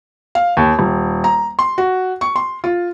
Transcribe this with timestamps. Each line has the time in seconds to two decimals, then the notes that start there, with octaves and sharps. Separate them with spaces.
0.35 F5
0.57 D#2
0.79 D#1
1.24 A#5
1.59 C6
1.78 F#4
2.21 C#6
2.36 C6
2.64 F4